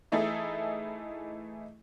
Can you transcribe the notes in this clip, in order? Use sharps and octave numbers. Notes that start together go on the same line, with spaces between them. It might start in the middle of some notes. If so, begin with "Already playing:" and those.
E3 A3 D#4 E4 G#4 A4